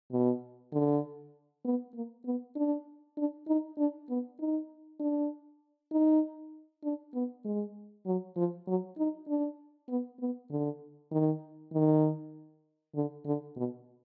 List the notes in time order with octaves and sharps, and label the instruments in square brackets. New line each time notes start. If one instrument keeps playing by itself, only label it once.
[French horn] B2
D3
B3
A#3
B3
D4
D4
D#4
D4
B3
D#4
D4
D#4
D4
B3
G#3
F#3
F3
F#3
D#4
D4
B3
B3
D3
D#3
D#3
D3
D3
B2